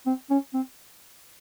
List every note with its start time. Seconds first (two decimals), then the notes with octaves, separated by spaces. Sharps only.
0.06 C4
0.30 C#4
0.54 C4